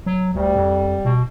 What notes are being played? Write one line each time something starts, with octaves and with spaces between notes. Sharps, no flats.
F#3
D2 G3
F2
B2